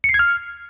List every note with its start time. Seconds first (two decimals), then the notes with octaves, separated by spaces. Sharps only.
0.04 C#7
0.09 C7
0.14 G#6
0.19 F6